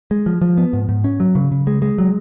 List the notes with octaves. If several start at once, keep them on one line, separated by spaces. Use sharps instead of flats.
G#3
F3
F3
B3
G#2
G#2
C#4
F#3
C#3
C#3
G#3
G#3
F#3